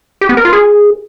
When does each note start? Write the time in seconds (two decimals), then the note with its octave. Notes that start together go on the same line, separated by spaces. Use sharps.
0.21 G4
0.29 B3
0.37 A#4
0.45 F4
0.53 G#4